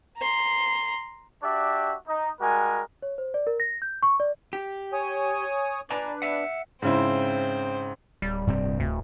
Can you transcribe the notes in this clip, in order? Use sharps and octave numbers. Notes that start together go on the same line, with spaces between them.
A#5 C6
D4 F#4 G4 D5 E5
D#4
G3 G#3 F#4 A#4 G#5
C#5
C5
D5
A#4
A#6
G6
C#6
D5
G4
C#5 G#5 D#6
D4 B4 D5 G#5 A#5
E5 F#5
G#2 C#3 C4 E4 C5
D1 G3
G2 C3 C4
D2